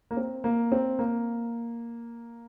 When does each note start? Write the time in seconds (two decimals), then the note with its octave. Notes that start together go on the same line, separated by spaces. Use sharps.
0.11 A#3
0.17 C4
0.44 A#3
0.72 C4
0.99 A#3